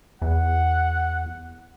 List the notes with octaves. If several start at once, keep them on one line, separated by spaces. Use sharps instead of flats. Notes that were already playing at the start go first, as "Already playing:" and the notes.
E2 F#5